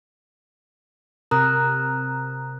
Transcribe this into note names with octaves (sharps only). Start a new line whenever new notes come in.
C3 A#4 A#5 D#6 F#6